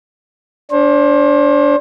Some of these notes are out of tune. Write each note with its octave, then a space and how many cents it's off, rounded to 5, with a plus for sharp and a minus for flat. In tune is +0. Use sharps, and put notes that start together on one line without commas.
D4 -20 C5 +30